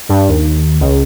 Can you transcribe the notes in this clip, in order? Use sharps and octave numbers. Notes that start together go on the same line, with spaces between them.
G2
D#2
C#2